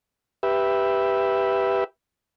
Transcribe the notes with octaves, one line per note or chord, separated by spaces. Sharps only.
G4 B4 E5